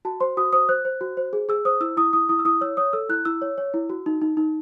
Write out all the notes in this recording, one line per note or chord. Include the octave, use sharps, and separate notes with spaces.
F#4 A5
C5 C6
F#4 D#6
C5 D#6
C5 F#6
C5
F#4
C5
G#4
G#4 E6
C5 D#6
E4 E6
E4 D#6
E4 D#6
E4 D#6
E6
E4 D#6
C#5 E6
C#5 D#6
A4 E6
E4 F#6
E4 E6
C#5
C#5
E4
F#4
D#4
D#4
D#4